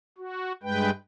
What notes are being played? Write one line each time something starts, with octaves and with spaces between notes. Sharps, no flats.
F#4
G2 G#3 B4 G5